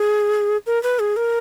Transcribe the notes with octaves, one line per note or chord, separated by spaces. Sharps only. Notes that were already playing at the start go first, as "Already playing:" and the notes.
Already playing: G#4
A#4
B4
G#4
A#4